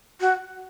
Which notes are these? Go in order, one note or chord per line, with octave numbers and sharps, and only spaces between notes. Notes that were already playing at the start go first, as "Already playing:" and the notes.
F#4